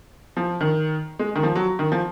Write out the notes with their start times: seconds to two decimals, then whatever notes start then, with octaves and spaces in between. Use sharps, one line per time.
0.37 F3
0.61 D#3
1.19 G#3
1.36 D#3
1.43 F3
1.55 F#3
1.79 D#3
1.92 F3